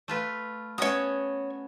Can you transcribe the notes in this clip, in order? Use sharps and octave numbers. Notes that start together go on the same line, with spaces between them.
A3 F4 B4
B3 C#4 F#4 C#5 D#6